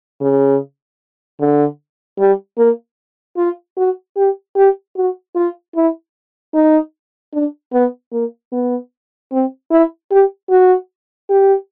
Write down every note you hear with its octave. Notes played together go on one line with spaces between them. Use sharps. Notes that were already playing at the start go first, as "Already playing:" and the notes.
C#3
D3
G3
A#3
F4
F#4
G4
G4
F#4
F4
E4
D#4
D4
B3
A#3
B3
C4
E4
G4
F#4
G4